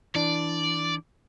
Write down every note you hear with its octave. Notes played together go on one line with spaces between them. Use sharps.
E3 D4 D5